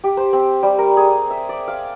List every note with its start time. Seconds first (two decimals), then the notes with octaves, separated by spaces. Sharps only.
0.04 G4
0.17 C5
0.33 C4
0.63 G3
0.78 A#4
0.97 G#4
1.30 E5
1.49 D5
1.68 F5